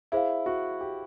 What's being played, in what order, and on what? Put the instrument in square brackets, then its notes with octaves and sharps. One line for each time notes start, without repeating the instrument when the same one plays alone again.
[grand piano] E4 [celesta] G#4 C5 F5
[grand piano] F#4
G4